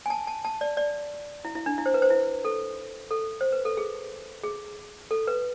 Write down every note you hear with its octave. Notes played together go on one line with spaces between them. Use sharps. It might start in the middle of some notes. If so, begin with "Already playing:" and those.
G#5
A5
A5
A5
D5
D5
E4
E4
D4
E4
C5
B4
C5
E4
A4
A4
C5
B4
A4
G#4
G#4
A4
B4